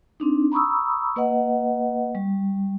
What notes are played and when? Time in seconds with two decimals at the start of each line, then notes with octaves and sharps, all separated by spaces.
0.20 C4 D4 D#4
0.52 A#5 B5 C#6 D#6 E6
1.16 A#3 B4 D#5 F#5
2.15 G3